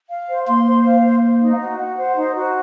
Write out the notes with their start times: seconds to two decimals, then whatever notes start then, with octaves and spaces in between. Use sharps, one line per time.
0.10 F5
0.29 C5
0.47 A#3 C6
0.66 C5
0.85 F5
1.04 C5
1.22 C5
1.41 D#4
1.60 F#4
1.78 F#5
1.98 C5
2.16 D#4
2.35 F#4